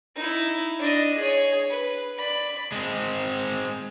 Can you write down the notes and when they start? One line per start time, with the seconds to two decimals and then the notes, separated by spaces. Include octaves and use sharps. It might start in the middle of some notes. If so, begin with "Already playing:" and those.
0.16 D#4 E4
0.79 D4 D#5
1.18 G#4 C#5
1.70 B4
2.17 D5 B5
2.72 G#3 C4